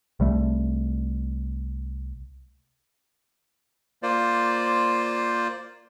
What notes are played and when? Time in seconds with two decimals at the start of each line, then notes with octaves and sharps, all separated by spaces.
0.20 C2 G3 A3
4.03 A#3 F4 C5 D5